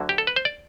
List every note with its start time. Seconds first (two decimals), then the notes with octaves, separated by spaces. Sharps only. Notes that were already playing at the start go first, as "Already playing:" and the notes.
Already playing: D2 D3 F#3
0.09 G4
0.18 A4
0.27 B4
0.36 C5
0.45 D5